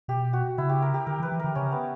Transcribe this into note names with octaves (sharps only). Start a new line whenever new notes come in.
B2 G4
F#4
C#3 E4
G4
A#4
G4
D3 A#4
E3 B4
E3
D3 A#4
C#3 C#4
B3